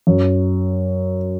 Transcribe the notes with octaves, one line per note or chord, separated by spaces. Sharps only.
F#2